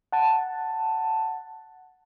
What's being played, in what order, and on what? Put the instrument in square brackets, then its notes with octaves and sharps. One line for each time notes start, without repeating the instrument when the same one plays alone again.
[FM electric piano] F#5 A5